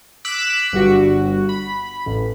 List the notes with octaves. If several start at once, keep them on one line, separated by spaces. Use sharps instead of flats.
D6 E6 F#6 B6 D7
G1 G2 F#4
B5
A1